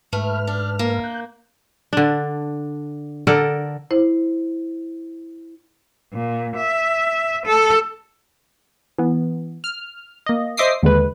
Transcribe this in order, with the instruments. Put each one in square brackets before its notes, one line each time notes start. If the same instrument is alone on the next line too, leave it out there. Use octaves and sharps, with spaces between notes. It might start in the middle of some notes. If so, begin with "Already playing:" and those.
[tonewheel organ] G#2 B4 F6 [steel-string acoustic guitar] A3
[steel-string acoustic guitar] D4
A#3
[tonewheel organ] F#6 G6
[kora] D3 D4
D3 A4 A#4 D5
[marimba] E4 C5
[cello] A#2
E5
A4
[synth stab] E3 B3
F6
A#3 D#5
C5 D#5 E5 D6 D#6 C7
D#2 D3 G#3 B4